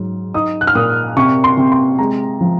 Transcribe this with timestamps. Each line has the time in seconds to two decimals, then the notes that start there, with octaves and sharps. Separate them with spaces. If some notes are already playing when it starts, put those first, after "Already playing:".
Already playing: G#2 F#3
0.34 D#4 D#6
0.61 F#6
0.67 F6
0.75 A#2 D#6
1.17 C3 C#6
1.44 C6
1.57 C3
1.72 C6
1.98 G#3 A#5
2.41 F3